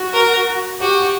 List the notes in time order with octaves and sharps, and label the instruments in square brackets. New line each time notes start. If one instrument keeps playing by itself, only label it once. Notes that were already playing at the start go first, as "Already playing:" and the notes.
Already playing: [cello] F#4
[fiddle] A#4
[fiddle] F#4 [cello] G4